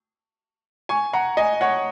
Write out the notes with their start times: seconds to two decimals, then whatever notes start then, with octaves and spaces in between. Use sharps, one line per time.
0.89 G#5 C#6
1.13 F#5 A#5
1.37 D#5 G#5
1.61 C#5 F#5